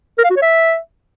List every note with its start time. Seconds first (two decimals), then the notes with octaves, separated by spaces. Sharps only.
0.18 A#4
0.24 F5
0.30 F#4
0.36 C#5
0.42 E5